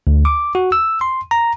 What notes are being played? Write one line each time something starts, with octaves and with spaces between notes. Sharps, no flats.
D2
D6
F#4
E6
C6
A#5